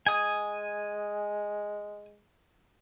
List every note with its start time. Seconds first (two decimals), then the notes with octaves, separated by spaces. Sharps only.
0.07 G#3 G#5 D#6